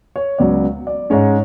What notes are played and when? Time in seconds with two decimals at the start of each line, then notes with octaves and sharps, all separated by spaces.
0.16 C#5
0.38 C#2 C#3 F#3 B3 D5
0.87 D5
1.10 G#2 G#3 C#4 C#5